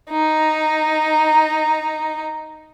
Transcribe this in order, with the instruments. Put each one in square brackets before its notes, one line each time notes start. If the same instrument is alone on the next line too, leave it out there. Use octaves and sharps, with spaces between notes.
[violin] D#4 A#5